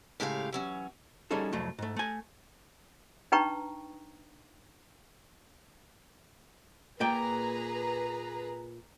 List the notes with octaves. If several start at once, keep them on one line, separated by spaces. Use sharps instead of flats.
A2 C#3 G#3 G4 D5 F5
E3 F#3 C#4
G3 C#4 D#4 G#4 A4
C2 F2 F#3 A3
G#2 A3
A3 G#5
D4 D#4 B4 G5 A#5 C#6
A#2 G#4 B4 G5 A#5